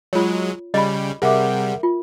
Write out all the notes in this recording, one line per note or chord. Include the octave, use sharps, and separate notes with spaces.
F#3 G#3 F4 C#5
C#3 G3 D#5 B5
C3 G3 G#4 A#4 E5 F#5 D6
F4